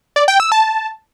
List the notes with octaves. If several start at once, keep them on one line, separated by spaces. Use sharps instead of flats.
D5
G5
E6
A5